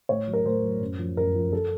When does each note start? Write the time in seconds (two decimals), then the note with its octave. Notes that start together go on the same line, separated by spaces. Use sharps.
0.09 A2 C#5
0.28 F#3
0.33 A#4
0.45 A2 C5
0.63 F#3
0.81 F#2
0.99 F3
1.17 F#2 A#4
1.35 F3
1.53 A4